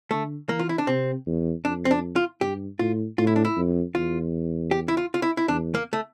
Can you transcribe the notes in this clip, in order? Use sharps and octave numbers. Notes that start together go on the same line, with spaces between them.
D3 A3
E3 A#3
F4
E4
D4
C3 C4
E2
F2 D4
C4
D4
F4
G2 G4
A2 F4
A2 F4
E4
D4
E4
F2
E2 F4
G4
E4
F4
F4
E4
E4
E2 D4
A#3
A3